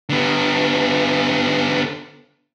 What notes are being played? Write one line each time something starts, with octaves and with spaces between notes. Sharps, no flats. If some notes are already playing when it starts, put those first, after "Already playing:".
D3 B3